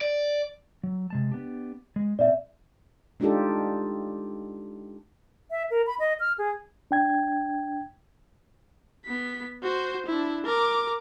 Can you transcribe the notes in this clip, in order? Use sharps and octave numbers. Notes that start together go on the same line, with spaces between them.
D5
F#3
C3 G#3 A5
B3 D4 G4
G#3
A#2 C4 D5 E5
G#3 D4 D#4 F4 G4 A4
E5
A#4
B5
D#5
F6
G#4
D4 G5 G#6
B3 B6
F#4 C5
D4 E4
A#4 D6